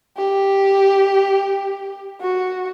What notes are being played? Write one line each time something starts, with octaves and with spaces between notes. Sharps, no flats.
G4
F#4